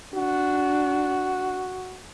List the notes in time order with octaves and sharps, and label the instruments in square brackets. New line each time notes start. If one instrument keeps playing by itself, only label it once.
[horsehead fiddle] D4 [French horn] F#4